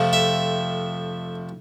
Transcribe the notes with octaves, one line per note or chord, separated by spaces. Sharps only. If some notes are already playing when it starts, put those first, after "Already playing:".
Already playing: F2 C3 F3 A3
E5